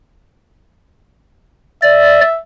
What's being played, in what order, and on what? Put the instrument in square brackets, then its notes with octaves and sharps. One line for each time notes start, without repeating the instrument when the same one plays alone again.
[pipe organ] D5 [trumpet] E5